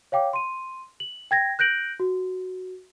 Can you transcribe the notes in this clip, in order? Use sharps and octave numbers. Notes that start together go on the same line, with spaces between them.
C#5 F5 G5 D6
C6 D#7
F#7
G5 G#6 A#6
F#6 G6 A#6 D7 F#7
F#4